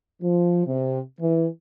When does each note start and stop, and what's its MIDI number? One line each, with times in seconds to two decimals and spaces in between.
0.22 0.65 53
0.66 0.99 48
1.20 1.46 52